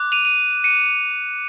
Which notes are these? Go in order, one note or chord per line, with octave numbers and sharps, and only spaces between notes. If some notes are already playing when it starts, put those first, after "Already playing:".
Already playing: D6 F#6
D#7 F7
D#7 F7
C#7 D#7